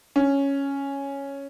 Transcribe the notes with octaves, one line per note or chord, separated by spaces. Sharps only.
C#4